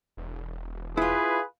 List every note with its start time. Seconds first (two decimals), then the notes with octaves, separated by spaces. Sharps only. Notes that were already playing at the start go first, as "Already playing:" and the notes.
0.17 E1
0.97 E4 F4 G#4 B4